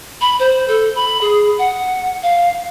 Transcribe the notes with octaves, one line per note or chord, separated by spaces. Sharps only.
B5
C5
A4
B5
G#4
F#5
F5